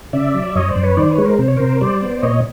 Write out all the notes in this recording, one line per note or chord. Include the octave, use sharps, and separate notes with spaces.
C#3 D5 E5
F#3
F#2 C#5 D#5
C5 D5
F#2
B4 C#5
D#3 C5 D5
B4 C#5
G#3
A#4 C5
C3 C5
C#5
C3 A#4 C5
G3 C5 D5
B3
A#2 C#5 D#5